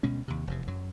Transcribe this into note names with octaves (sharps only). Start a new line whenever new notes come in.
D2 B2 G#3 C#4
D#2 C3
F1 E2 C3
F#2 F#3